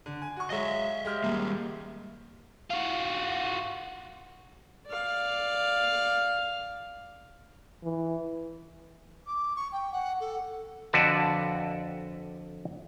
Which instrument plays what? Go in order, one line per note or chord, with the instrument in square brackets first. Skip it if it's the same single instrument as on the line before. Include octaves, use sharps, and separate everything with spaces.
[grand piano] D3
G#5
F#4 C#6
[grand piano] F#3 G#3 G#4 [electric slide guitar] D#5 E5
[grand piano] G#3 G4 F6
[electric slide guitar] G3 A#3
[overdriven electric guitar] F4 F#4
[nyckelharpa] D5 F5
[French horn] E3
[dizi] D6
C#6
G5
F#5
A4
[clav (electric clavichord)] F2 D3 F#4 B4 D5 A5